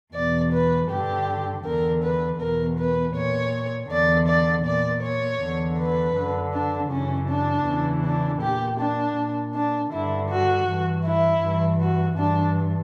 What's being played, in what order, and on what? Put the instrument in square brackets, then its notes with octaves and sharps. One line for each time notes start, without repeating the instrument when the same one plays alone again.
[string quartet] E2 B2 D5
B4
G2 D3 G4
E2 D3 A#4
B4
E2 B2 A#4
B4
A#2 C#5
E2 D3 D5
D5
A#2 D5
C#5
E2 D3
B4
F#2 D3
D4
F#2 C#3 E3 C#4
D4
E2 C#3 E3
D4
A#2 G4
D4
A#2
D4
G2 D3 E4
F#4
G2 E3
E4
G2 E3
F#4
G2 E3 D4